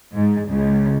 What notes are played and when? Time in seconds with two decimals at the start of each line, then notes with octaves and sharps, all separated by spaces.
0.15 G#2
0.49 C#2